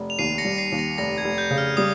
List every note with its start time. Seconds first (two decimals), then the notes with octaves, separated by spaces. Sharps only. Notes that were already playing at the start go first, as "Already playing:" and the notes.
Already playing: F1
0.10 F7
0.19 D#2 C7 D#7
0.38 A#6 C#7
0.45 G3
0.58 C7
0.72 D#2
0.79 A#6
0.98 F1 A#6
1.18 G#6
1.24 F1
1.38 G6
1.51 C#3
1.58 F6
1.77 G3 D#6